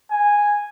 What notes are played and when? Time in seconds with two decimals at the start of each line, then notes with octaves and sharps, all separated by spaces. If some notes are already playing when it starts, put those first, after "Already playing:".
0.11 G#5